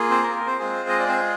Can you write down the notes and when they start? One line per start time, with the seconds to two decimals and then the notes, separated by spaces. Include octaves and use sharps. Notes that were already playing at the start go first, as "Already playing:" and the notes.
Already playing: A#3 F4 G#4
0.10 C4 C5
0.23 A#4
0.31 G#4
0.35 A#4
0.47 C4 C5
0.59 G#3 C4 F4 G#4
0.89 D#5
0.99 D5
1.08 C4 C5